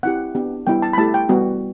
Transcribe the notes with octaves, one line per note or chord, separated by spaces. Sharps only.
C4 E4 G4 F#5
B3 D4 G4
G3 B3 E4 G4 G5
A5
B5
A3 E4 G4 A5
G5
G3 B3 F#4